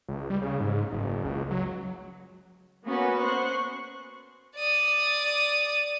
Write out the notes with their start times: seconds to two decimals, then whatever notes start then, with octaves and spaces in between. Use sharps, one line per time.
0.09 C#2
0.30 G3
0.42 C#3
0.60 G#2
0.92 F#1
1.24 C#2
1.51 F#3
2.85 A#3 B3 C#4 F#4 B4
3.22 C5 C#6 F#6
4.57 D5 D#6